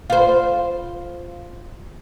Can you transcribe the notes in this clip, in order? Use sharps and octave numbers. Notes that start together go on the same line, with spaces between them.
F4 C5